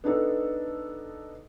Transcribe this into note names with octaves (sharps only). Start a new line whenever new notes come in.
B3 D4 D#4 A4